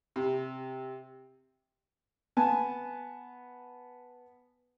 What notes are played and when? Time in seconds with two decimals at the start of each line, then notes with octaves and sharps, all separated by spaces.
0.16 C3
2.37 B3 G#5 A5